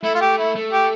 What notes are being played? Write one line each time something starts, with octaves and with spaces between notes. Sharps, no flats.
A3 E4
F4
G4
E4
A3
G4